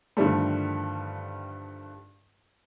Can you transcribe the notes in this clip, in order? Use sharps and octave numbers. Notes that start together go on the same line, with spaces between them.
G2 D3 D#3 F3 G3 A3